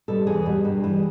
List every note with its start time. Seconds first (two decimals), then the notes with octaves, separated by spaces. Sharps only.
0.08 B2 G3 A4
0.27 E2 G#4
0.46 B2 G3
0.65 G2
0.84 E3 G3